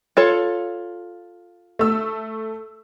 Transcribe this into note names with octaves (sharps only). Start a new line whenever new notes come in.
F4 A4 C#5
A3 E6